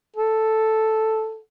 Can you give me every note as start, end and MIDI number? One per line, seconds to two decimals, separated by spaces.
0.16 1.38 69